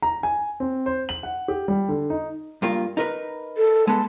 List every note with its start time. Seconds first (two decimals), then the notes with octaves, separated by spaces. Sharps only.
0.02 A#5
0.23 G#5
0.60 C4
0.86 C5
1.09 F#7
1.23 F#5
1.48 G4
1.68 G3
1.89 D3
2.10 D#4
2.62 G2 A#3 F4
2.97 D#4 A#4 B4
3.57 A4
3.88 G#3 B3 A5